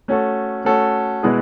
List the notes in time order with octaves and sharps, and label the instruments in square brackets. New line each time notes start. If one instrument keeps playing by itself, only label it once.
[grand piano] A3 C#4 F#4 A4
A3 C#4 F#4 A4
B2 G#3 B3 E4 G#4